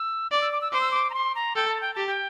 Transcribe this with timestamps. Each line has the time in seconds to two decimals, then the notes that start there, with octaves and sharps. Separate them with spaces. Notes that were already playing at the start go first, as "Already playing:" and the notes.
Already playing: E6
0.32 D5 D6
0.41 E6
0.52 D6
0.61 E6
0.72 C5 D6
0.81 E6
0.91 D6
1.10 A#5
1.14 C6
1.35 A#5
1.56 A4 G5
1.68 A5
1.81 G5
1.94 G4 A5
2.07 G5